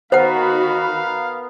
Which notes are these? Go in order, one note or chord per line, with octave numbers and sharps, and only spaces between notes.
D#3 B3 F#4 A#4 C5 F5 F#5 B5